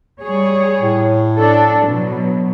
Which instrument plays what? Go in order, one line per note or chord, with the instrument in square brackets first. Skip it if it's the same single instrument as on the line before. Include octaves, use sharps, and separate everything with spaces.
[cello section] G3 G#4 C#5
[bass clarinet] A2
[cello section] D4 A4
B2 F#3